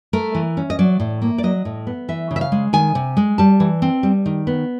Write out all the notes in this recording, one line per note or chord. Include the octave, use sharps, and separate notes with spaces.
A3 A#4
E3
C#4
D#5
F#3 D5
A2
A#3
D5
F#3 D#5
A2
B3
E3 E5
C#3
E5
F5
G#3
D#3 G#5
C3
G#3
G3 A5
E3
C4
G3
D#3
B3